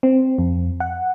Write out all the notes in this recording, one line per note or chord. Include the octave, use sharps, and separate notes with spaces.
C4
F2
F#5